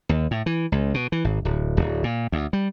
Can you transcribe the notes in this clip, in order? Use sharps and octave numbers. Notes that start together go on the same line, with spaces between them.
D#2
A2
E3
C#2
B2
E3
G#1
D1
D1
A#2
D2
G3